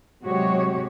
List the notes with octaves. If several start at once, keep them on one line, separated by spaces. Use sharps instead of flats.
C3 F#3 G#3 F#4 G4 C#5